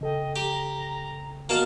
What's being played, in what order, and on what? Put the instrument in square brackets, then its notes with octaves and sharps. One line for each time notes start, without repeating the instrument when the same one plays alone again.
[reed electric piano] C#3 A4 G5 [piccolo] D#5
[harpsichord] G4 [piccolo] A#5
[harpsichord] A#3 A#4 A5 [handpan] B3 F#4 D#5 [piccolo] F6